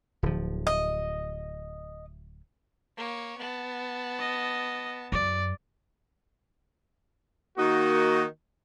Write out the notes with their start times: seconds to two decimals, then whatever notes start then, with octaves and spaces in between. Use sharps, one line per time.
0.23 D1 D3 F3
0.67 D#5
2.97 A#3 C#5
3.37 B3 A5
4.19 D#5
5.12 F#2 D5
7.57 D#3 A#3 D#4 F#4